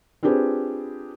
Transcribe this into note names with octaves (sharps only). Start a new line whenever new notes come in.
C4 D4 F4 G4 G#4 B4